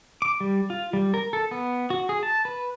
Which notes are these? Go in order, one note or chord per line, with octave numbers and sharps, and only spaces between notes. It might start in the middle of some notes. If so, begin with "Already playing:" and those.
D6
G3
F4
G3
A#4
A4
B3
F#4
G#4
A5
B4